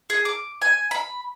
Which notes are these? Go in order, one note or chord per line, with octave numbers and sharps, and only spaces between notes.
G#4
D6
G#5
B5